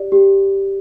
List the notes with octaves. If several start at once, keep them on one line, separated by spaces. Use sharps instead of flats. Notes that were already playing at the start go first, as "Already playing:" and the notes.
Already playing: G4 D5
G4